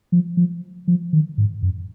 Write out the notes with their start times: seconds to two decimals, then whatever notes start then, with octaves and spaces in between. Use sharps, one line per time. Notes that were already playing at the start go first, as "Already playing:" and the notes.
0.12 F3
0.37 F3
0.88 F3
1.13 D#3
1.38 G#2
1.63 F#2